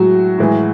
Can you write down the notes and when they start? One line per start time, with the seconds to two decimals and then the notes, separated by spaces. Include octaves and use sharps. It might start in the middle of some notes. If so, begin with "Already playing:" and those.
Already playing: A2 F#3 G#3 F#4
0.38 A2 E3 G#3